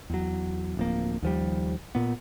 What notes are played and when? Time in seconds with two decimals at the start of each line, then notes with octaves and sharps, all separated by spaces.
0.10 E2 F#3
0.77 D1 F3 A#3
1.22 D#2 F3 G3
1.95 A#2 B3